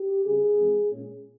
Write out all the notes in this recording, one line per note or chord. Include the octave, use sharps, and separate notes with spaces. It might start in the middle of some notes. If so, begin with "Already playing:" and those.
Already playing: G4
C#3 G3 C4 G#4
F2 E3 G#3 C4
A#2 G#3 C#4